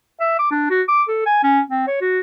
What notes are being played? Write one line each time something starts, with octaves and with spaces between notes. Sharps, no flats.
E5
D6
D4
F#4
D6
A4
G#5
C#4
C4
C#5
F#4